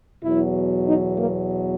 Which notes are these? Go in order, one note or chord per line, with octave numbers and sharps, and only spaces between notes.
E2 B2 F#3 E4
D#4
A#3